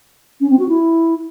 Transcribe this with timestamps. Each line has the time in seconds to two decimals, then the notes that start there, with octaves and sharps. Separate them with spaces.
0.41 C#4
0.50 C4
0.59 F#4
0.69 E4